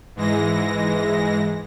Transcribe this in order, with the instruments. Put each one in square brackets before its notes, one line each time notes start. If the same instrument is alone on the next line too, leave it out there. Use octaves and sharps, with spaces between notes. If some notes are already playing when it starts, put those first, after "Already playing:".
[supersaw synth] G#2 E3 G#3 A#6